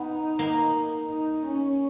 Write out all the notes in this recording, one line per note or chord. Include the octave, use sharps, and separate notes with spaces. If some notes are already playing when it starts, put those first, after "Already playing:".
Already playing: B3 D#4
A#3
D#4
C#4